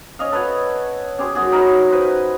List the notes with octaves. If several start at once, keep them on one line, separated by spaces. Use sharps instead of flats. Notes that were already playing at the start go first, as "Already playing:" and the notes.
C#4 D#5 F5
A4 B4 C#5 F#5
C#4 G4 G#4 C6
F#2 F#4 G#4
D#4 A#4 C#5 B5
B4 C5